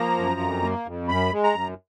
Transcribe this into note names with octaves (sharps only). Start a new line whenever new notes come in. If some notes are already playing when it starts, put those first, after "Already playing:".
Already playing: F3 A#3 A#5
F#2
F2
A#3
F2
F#2 B5
G#3
A#5
F#2